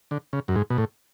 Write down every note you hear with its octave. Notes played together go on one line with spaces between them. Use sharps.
D3
C#3
F#2
G#2
B2
A2